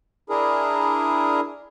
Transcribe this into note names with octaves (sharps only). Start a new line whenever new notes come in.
D4 E4 G#4 A#4